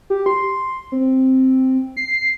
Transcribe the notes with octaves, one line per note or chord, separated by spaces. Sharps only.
G4
C6
C4
C7